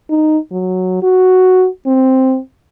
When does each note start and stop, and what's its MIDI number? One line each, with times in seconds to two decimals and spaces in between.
0.10 0.38 63
0.52 0.98 54
1.03 1.67 66
1.86 2.38 60